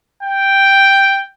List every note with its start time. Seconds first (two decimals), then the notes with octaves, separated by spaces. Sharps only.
0.23 G5